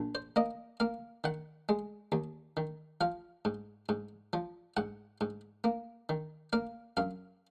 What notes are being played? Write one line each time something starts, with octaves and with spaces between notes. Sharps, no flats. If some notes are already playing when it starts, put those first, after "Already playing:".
Already playing: A#1
C5
A#3 D#5
A#3 F5
D#3 F#5
G#3
D#2
D#3
F3 F5
G#2
G#2
F3
G#2 F#5
G#2
A#3
D#3
A#3 F5
F#2 F5